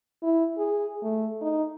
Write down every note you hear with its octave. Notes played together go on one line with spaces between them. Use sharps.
E4
G#4
A3
D#4